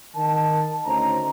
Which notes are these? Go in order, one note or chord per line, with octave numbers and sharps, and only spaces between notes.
D#3 A5
D2 C#4 D#4 C5 A#5